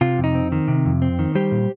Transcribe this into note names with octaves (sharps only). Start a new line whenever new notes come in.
C3 F4
F2
D#4
C4
D#3
C3
F2
C4
D#3
G3 G4 C5
A#2